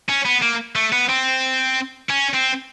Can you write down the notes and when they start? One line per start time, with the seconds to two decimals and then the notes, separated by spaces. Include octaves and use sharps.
0.09 C#4
0.26 B3
0.42 A#3
0.76 A3
0.93 B3
1.09 C4
2.09 C#4
2.34 C4